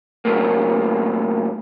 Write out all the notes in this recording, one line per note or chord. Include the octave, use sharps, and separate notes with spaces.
A2 C#3 F#3 A3 A#3